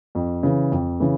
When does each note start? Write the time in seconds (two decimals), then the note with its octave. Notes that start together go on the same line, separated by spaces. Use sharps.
0.15 F2
0.43 C#3 E3
0.72 F2
1.00 C#3 E3